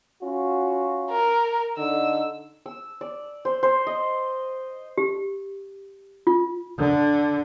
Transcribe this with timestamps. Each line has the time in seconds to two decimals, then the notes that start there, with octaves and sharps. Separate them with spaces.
0.22 C#4 F4 F#4
1.11 A#4
1.78 D3 D#4 E6
2.66 E6
3.01 D5
3.45 C5
3.63 C5
3.87 D#5
4.98 G4
6.27 F4
6.78 D3